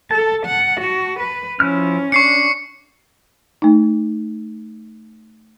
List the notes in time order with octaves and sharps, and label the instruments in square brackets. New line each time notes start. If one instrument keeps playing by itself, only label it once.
[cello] A4 [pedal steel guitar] A5
[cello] F#5
F#4
B4
[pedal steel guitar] F3 E4 F6 [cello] C#4
[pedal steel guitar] D4 [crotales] C#6 C7 C#7
[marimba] A3 D#4